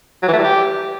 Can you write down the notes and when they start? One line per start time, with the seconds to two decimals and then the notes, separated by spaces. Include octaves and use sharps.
0.22 F#3
0.28 E3
0.33 A3
0.38 G3
0.44 G4